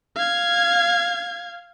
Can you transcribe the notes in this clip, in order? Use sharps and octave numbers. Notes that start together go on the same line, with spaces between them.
F5 G#6